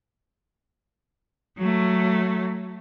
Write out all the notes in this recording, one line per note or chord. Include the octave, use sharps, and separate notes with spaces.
F#3 A3